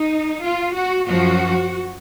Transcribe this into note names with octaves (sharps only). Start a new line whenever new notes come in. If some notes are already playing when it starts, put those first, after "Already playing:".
Already playing: D#4
F4
F#4
F#2 F3 F#4